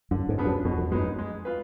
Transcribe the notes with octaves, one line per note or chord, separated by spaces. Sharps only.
F#2 D3
G#2
F3 B3 D4 G#4
F#2
F2 B2
F2
F#2 G#3 B3 D#4
G#3
F4 B4